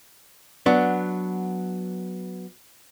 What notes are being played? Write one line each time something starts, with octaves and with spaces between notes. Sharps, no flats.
F#3 B3 D4